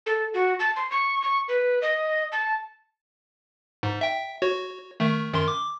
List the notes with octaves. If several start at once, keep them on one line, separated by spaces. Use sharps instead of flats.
A4
F#4
A5
C6
C#6
C#6
B4
D#5
A5
G#2
E5 G5
F#4 C#5
D#3 A3
F#2 D#3 C6
D6